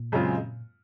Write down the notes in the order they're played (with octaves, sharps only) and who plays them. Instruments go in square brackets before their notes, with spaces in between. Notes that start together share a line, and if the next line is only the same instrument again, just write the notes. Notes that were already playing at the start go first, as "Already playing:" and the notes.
Already playing: [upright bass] A#2
[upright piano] F#2 C#3 G#3 C4 F4